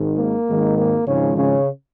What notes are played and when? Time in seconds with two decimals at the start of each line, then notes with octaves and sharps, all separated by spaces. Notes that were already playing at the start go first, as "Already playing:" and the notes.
Already playing: G#1 G#2 D#3
0.18 A#3
0.47 G#1 G#2 D#3
0.77 A#3
1.07 G#1 G#2 C#3 F3 C#4
1.37 C#3 C#4